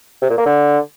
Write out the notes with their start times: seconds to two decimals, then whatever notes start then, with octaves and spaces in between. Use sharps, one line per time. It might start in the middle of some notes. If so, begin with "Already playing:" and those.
0.22 C3
0.30 A#2
0.38 A#3
0.46 D3